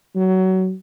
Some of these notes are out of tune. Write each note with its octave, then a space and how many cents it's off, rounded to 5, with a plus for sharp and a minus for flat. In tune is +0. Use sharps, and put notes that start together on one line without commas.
F#3 +20